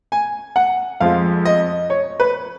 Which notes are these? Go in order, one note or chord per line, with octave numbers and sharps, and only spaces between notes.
G#5
F#5
F2 F3 G#3 F5
D#5
C#5
B4